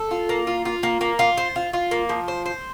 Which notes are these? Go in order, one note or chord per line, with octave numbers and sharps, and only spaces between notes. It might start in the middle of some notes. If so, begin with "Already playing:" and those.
Already playing: A4
F4
A#3
F4
F4
A#3
A#3
F4
C5
F4
F4
A#3
F3
C5
C5